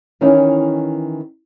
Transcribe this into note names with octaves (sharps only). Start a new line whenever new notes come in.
D#3 E3 C#4 D#4 E4